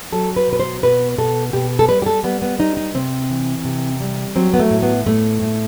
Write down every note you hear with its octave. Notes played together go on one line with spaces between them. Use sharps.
F#3 A4
B4
B2 B4
C5
B2 B4
B2 A4
B2 G4
A4
G3 B4
G4
A4
G3 B3
B3
G3 D#4
D#4
C3 C4
E3
C3
G3
F#3 C4
B3
A3
A2
B3
A2 A3
A2